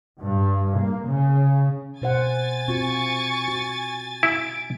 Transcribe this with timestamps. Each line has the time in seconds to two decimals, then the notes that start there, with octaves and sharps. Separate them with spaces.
0.21 G2
0.77 A#3
1.07 C#3
2.02 B2 C5 F#5 G#5 A6
2.68 C4 F4 F#4 C#6
3.48 F#4
4.23 E4 D7